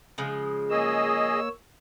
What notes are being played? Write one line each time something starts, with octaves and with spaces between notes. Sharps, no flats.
C#3 F3 G#3
A#3 G#4 C#5 D#5 E6